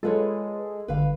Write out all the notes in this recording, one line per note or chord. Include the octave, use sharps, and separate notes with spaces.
G#3 F4 A4 B4 C#5
G1 D3 G3 B4 F5